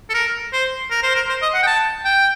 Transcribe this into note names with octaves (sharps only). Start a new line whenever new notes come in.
A4
A#4
C5
A#4
C5
A#4
C5
D#5
F#5
G5
A5
G5